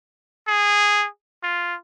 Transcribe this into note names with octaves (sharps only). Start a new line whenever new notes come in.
G#4
F4